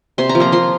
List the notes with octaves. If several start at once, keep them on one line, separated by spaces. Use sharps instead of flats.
C3 C6
A#5
F3
A#3 A#5
F3 C6